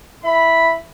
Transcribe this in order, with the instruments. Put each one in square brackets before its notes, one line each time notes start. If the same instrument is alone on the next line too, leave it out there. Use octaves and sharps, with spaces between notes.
[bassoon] E4 [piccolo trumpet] B5